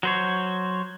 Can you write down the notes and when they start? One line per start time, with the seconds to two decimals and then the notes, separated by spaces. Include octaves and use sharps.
0.03 F#3 C5 C#5